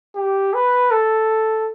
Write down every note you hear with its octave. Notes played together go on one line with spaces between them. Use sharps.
G4
B4
A4